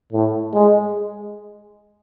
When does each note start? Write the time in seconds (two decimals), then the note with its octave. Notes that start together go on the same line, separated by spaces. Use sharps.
0.12 A2
0.53 G#3